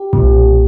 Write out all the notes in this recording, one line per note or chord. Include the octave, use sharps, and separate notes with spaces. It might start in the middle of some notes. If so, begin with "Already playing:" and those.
Already playing: G4
B1 A#2